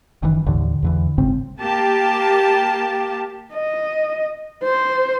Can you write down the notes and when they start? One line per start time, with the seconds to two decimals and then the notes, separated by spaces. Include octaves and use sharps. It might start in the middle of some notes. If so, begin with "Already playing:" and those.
0.23 F#1 D#3 E3
0.46 D#2 A2 D3 E3
0.83 E2 D3 E3
1.18 G1 G#2 C#3 C4
1.61 A#3 G4 A5
3.54 D#5
4.64 C5